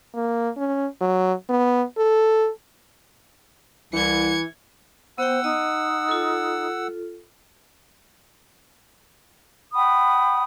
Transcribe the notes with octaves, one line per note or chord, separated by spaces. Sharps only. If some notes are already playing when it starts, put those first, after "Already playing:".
A#3
C#4
F#3
B3
A4
C2 E3 G#6 C#7
B3 C5 F#5 G5 E6
D#4 D#5
F4 A4
F#5 G5 B5 D#6